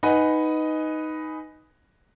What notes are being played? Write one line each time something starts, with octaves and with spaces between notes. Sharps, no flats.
D#4 B4 D#5 F#5 G#5